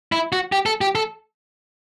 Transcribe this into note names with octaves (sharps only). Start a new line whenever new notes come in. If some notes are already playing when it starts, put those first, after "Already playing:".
E4
F#4
G4
A4
G4
A4